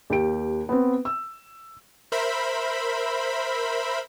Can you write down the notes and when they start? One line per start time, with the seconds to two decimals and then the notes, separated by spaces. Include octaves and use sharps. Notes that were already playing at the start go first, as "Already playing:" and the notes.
0.10 D#2 G4 D7
0.69 B3 C4
1.05 E6
2.12 A#4 C5 E5 B5